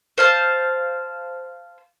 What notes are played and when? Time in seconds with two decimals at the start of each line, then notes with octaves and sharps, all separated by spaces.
0.18 C5 F5 A5